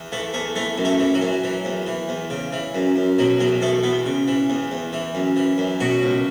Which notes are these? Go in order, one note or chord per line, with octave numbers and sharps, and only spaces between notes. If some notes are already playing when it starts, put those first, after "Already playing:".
Already playing: E2
E3 A3
E2 A3
E3 A3
F#2
A3
E3
F#3
F#2
E3
E2
E3
E2
C#3
E3
F#2
F#2
B2 F#3
E2 F#3
B2 A3
E2 B3
C#3
E3
E2
E2
E3
F#2
E3
F#2
B2 F#4
C#2